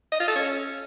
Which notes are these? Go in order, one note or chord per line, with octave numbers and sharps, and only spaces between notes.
D#5
F4
A4
C#4